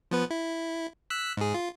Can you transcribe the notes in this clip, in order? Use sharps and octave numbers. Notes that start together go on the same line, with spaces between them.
F3 B3 B4
E4
E6 F#6 B6
G#2 G#4
F4